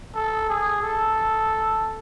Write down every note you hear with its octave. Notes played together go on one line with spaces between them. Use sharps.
A4
G#4
A4